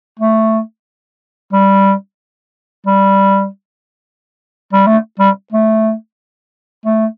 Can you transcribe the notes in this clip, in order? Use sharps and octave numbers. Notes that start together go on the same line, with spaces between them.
A3
G3
G3
G3
A3
G3
A3
A3